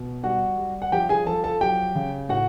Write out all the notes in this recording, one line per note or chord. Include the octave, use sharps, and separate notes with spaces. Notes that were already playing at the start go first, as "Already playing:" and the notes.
Already playing: B2
G3 F#4 F#5
G3
F#5
F3 G4 G5
G#4 G#5
F3 A4 A5
A4 A5
F#3 G4 G5
C#3
A2 F#4 F#5